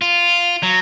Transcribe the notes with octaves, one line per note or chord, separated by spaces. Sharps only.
F4
F#3